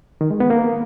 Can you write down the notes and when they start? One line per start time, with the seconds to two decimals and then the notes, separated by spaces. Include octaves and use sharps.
0.21 D#3
0.31 G#3
0.40 B3
0.50 A#3